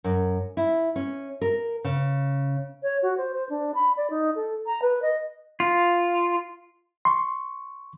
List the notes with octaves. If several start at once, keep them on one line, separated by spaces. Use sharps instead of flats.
F#2
E4
C#4
A#4
C#3
C#5
F#4
C5
C5
D4
B5
D5
D#4
A4
A#5
B4
D#5
F4
C6 C#6